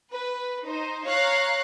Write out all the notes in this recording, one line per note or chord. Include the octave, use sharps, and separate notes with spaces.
B4
D#4 C5
C#5 F5 A#5 F#6